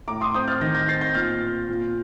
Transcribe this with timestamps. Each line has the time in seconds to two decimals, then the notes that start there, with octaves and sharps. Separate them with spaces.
0.08 A2 A#5 D6
0.21 C6 D#6
0.34 C4 D#6 G6
0.48 F6 A6
0.61 D#3 G6 A#6
0.75 G6 A#6
0.88 C4 A6 C7
1.01 G6 A#6
1.14 A#2 F6 A6
1.42 C4
1.69 A#2